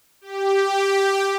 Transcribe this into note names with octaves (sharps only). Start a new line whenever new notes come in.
G4